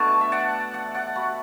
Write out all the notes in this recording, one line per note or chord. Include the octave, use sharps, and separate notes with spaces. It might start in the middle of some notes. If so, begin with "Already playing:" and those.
Already playing: B2 A3 D4 A5
E5
D5 F#5
D5 F#5
D5 F#5
F#4 B4